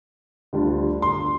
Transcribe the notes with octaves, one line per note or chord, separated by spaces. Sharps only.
D2 D3 G3 D4 F4
C6